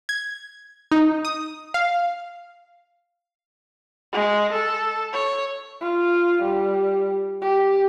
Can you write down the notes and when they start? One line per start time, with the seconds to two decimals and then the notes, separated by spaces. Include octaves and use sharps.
0.09 G#6
0.91 D#4
1.25 D#6
1.74 F5
4.13 G#3
4.53 A4
5.13 C#5
5.81 F4
6.43 G3
7.41 G4